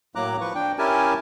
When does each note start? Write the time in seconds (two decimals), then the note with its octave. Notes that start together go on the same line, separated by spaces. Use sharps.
0.15 A2 F#3 A#3 A#5 D6 F#6
0.41 F3 B4 C#6
0.55 D4 G5
0.78 C#4 E4 G4 A#4 G#5 A5